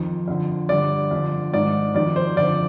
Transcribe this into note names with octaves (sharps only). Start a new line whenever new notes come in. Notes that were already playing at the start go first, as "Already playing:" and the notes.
Already playing: F2 D#3
F2 D3
G2 D3 D5
F2 D3
G#2 D#3 D5
F2 D#3 D5
C5
F2 D3 D5